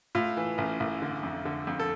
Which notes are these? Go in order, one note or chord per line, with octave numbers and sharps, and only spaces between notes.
A2 F4
E3
A1
A1
D3
F2
D3
F2
A4